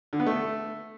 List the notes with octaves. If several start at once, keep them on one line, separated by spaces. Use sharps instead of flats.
D3
B3
A3